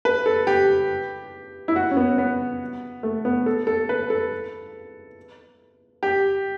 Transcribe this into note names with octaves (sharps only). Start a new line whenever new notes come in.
B4
A4
G4
E4
F#4
C#4
B3
B3
A3
B3
A4
A4
B4
A4
G4